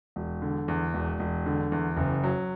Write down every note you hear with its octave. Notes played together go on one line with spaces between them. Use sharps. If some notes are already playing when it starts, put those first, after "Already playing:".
E1
D3
E2
E1
E1
D3
E2
F#1
F#3